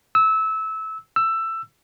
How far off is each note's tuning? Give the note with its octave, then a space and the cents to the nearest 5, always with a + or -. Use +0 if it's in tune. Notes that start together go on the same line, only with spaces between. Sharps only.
E6 -20
E6 +15